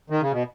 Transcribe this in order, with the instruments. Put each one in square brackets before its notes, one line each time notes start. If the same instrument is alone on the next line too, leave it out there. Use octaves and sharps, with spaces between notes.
[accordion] D#3
C#3
B2